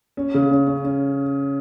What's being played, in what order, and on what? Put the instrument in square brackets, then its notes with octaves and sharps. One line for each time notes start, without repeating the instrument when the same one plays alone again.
[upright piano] C#4
C#3
C#4
C#4
C#4